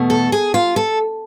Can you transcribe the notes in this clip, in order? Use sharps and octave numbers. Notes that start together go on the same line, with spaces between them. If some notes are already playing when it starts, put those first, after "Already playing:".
Already playing: E2 B2 A3
A4
G#4
F4
A4